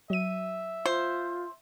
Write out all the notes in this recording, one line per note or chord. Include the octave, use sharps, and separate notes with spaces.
F#3 E5 D#7
F4 C5